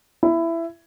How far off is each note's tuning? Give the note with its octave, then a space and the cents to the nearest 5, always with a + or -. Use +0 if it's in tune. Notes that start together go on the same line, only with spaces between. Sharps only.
E4 +15